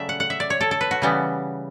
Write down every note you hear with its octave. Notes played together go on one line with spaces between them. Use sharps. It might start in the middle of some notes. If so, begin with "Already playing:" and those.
Already playing: C#3 F#3 A3 D5 E5
F#5
F#5
E5
D5
C#5
A4
A4
B4
F#4
C#3 E3 G3 B3